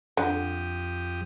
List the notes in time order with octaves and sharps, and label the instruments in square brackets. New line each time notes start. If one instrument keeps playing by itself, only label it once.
[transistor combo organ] F2 G4 D#6 [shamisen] D3